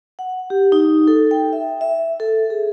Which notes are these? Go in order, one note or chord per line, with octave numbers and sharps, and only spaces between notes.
F#5
G4
D#4
A4
G5
E5
E5
A4
G#4